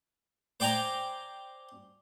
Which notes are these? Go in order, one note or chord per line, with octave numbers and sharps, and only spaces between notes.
C5 D5 G5 G#5 A#5